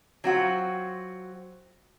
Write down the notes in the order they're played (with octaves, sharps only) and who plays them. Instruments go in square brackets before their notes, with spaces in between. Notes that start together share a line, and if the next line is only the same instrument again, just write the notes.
[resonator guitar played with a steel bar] F#3 C4 F4 F#4